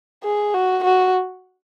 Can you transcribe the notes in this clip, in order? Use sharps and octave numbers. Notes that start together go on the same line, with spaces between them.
G#4
F#4
F#4